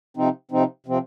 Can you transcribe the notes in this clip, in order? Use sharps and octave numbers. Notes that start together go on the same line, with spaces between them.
C3 F3 C4 D#4
C3 F3 C4 D#4
C3 F3 C4